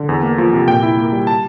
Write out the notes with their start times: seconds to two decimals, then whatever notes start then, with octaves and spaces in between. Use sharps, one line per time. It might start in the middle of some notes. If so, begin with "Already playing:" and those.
Already playing: D3
0.09 E2
0.23 A#3
0.38 F3
0.53 C3
0.68 A#2 G5
0.83 E4
0.97 A#3
1.12 G3
1.27 A5